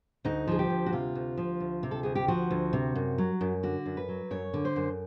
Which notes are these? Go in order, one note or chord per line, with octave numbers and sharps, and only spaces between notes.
D2 D#4
F3 G#4
G4
D2
F#4
C3 F4
D2
F3
D2
C3
A4
D2 G#4
G4
F3 F#4
D2
C3
F#2
F#3
F#2
D3 F#4
F#2
B4
F#3
F#2 C#5
D3
C5
F#2